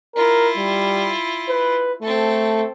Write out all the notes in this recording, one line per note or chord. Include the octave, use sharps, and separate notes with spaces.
E4 F4 A#4
G3
B4
A3 C4 A4